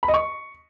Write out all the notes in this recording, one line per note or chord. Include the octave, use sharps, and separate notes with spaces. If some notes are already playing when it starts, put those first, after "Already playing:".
B5
D#5
C#6